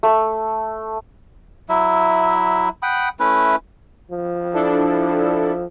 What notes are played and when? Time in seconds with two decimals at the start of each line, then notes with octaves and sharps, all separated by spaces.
0.03 A3
1.69 F#3 E4 E5
2.83 F#5 G5 B5 D#6
3.20 A3 C#4 E4 B4
4.11 F3
4.53 D4 E4 A4